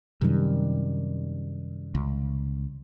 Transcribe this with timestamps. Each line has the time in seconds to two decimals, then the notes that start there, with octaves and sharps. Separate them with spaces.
0.21 F#2 C3 D#3 G3
1.95 C#2